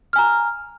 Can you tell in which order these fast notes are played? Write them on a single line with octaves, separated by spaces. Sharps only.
F6 G#5 A#5